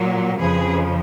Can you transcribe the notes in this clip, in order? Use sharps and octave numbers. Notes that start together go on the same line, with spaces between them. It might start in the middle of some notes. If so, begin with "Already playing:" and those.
Already playing: A#2 F#3
F2 C#3 F3 G#4 B4